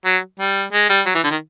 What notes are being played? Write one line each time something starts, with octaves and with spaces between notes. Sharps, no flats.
F#3
G3
G#3
G3
F#3
E3
D3
D#3